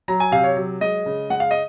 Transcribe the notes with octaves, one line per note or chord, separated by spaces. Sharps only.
F#3 A#5
G#5
C3 F5
C#5
F#3
G#3 D#5
C#3
G#3 F#5
F5
D#5